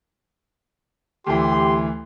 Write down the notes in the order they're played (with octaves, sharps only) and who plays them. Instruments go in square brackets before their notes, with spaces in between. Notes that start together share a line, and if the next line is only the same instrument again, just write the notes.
[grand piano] D2 E3 [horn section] G4 C6